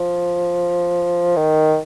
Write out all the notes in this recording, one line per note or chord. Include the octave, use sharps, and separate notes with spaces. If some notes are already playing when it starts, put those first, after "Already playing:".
Already playing: F3
D#3